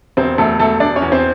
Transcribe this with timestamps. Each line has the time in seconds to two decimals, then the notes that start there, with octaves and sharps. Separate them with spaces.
0.17 E1 C4 C5
0.38 E1 A3 A4
0.59 E1 A3 A4
0.80 E1 D4 D5
0.96 C#4 C#5
1.02 E2
1.12 C4 C5